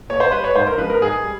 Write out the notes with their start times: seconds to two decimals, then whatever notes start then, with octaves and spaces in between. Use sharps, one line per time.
0.09 A#2 C#5
0.20 C5
0.32 G3 B4
0.44 C#5
0.55 G#2 C5
0.67 A#4
0.78 F3 G#3 B4
0.90 A#4
1.01 G#2 G#4
1.25 G3